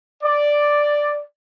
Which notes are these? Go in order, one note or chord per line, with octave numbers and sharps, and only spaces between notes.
D5